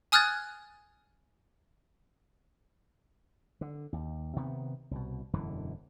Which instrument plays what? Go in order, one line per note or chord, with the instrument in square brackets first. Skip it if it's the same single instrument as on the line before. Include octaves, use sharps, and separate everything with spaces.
[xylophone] G#5 D#6 F6 F#6 G#6 A6
[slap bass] D3
D#2
C3 D#3 B3
C2 B2
E1 F#2 D3 E3